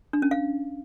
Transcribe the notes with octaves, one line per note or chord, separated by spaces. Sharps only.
D4
C#4
F5